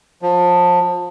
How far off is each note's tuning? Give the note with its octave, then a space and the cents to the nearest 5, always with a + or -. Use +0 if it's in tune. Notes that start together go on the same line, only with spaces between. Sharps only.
F3 +25